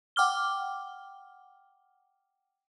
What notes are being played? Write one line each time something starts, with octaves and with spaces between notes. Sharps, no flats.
F#5 G5 D6 F6 G7